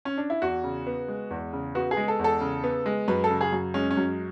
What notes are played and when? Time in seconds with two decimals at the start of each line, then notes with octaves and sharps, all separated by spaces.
0.05 C#4
0.18 D4
0.30 E4
0.42 E2 F#4
0.64 C#3
0.87 B3
1.08 G#3
1.31 E2
1.53 C#3
1.75 B3 F#4
1.91 G#4
1.97 G#3
2.08 A4
2.19 E2
2.24 A4
2.41 C#3
2.64 B3
2.86 G#3
3.08 F#2 B4
3.24 A4
3.30 C#3
3.41 G#4
3.52 F#2
3.74 G#3 C#4
3.91 C#4
3.97 F#2